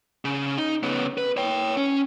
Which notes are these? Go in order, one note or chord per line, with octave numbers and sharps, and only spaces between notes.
C#3
D#4
C#3 B3
B4
C#5 G5
C#4